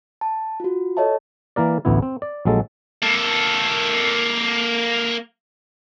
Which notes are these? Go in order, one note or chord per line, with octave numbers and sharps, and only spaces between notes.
A5
F4 F#4
A4 C#5 D#5 E5 A5
E3 A#3 A#4 D5
A1 D2 B3 E4
C4
D5
A#1 F#3 G#3 A4
A#3 A4